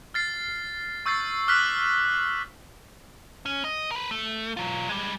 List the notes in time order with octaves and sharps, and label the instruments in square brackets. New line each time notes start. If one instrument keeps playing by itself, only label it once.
[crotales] F6 A6 C7
C#6 E6 G6 A6 C7
D6 F6 F#6 B6 F#7
[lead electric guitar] C#4
D#5
A#4 B4
A3
F#3 F4
G3 G#3